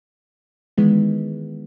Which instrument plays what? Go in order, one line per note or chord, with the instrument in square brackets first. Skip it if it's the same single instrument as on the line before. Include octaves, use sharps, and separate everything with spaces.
[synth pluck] D#3 E3 G#3 B3